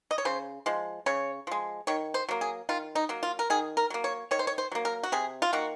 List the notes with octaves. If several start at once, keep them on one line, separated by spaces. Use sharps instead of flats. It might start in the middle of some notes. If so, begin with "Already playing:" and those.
D#5
C#5
C#3 C5
F3 G#3
C#3 C#5
F3 G#3
D#3 C#5
C5
F#3 A#3
G#4
D#3 F4
D#4
F#3 A#3
F4
A#4
D#3 G#4
A#4
F#3 A#3
C#5
D#3 C#5
C5
C#5
C5
F#3 A#3
A#4
F#4
C3 G#4
F4
D#3 A#3 F#4